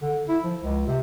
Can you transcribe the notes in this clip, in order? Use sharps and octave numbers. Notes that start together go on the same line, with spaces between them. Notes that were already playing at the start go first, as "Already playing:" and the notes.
D3
E4
F3
C#2
C3